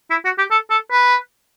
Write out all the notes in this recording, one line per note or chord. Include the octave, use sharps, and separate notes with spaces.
E4
F#4
G4
A4
A4
B4